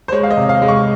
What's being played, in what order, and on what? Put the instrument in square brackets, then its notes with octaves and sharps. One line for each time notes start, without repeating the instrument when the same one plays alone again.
[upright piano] C5
G#3 C#5
F5
D#5
C3
F5
G#3
C#6